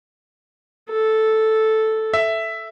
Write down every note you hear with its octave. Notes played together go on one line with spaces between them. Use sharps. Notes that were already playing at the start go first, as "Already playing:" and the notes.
A4
E5